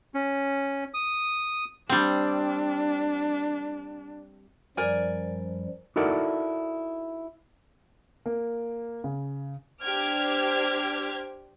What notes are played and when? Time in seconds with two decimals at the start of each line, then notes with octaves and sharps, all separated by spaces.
0.14 C#4
0.94 D#6
1.89 G3 C4 D4
4.77 F#2 F3 G3 A#4 D5 G#5
5.96 D#4 E4 F#4 A4 A#4 D5
8.26 A#3
9.04 C#3
9.82 D4 G4 C5 D6 F6 G#6